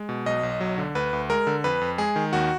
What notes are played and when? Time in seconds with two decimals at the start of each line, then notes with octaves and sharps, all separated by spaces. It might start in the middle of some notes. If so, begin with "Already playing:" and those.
Already playing: G#3
0.09 B2
0.26 B1 D#5
0.43 B1
0.60 F#3
0.78 D3
0.95 D2 B4
1.13 D2
1.30 G#3 A#4
1.47 D3
1.64 F2 B4
1.81 F2
1.98 G#3 G#4
2.16 D#3
2.33 D#2 F#4